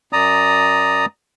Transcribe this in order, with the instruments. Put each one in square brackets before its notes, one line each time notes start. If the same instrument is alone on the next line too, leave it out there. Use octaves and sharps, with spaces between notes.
[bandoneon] F#2 D5 A#5 D#6